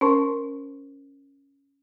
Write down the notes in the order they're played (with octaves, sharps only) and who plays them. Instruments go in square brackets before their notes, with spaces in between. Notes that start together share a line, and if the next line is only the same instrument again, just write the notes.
[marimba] C#4 A#4 C5 A5 C6 C#6